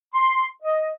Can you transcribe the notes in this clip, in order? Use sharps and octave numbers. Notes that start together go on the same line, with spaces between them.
C6
D#5